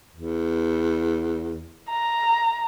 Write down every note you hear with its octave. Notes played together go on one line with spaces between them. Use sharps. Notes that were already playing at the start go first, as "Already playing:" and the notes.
E2
A#5